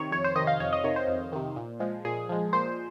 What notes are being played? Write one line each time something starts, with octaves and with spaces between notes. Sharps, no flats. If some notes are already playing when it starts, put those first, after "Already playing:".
Already playing: C3 D#3 C#5
F2 C#5
C5
C3 D#3 D#5
F5
F2 C#5
D#5
C3 D#3 C#5
C5
F2
C3 D#3
A#2
F3 G#3
A#2 G#4
F3 G#3
A#2 C5